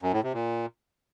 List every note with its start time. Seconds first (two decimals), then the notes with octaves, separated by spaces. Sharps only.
0.02 F#2
0.13 A2
0.23 C3
0.34 A#2